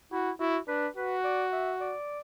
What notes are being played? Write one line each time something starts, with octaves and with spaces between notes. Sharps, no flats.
E4 F#4
E4 F#4
D4 B4
F#4 B4
D5
E5
D5